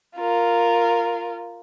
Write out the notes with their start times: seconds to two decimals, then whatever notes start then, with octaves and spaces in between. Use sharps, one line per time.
0.16 F4 A#4